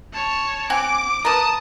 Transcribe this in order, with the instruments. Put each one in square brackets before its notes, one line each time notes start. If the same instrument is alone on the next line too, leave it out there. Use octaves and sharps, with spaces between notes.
[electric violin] C#5 A5
[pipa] C4 F#5 G#5 [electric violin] D6
[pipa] A#4 B4 [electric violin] A5 D#6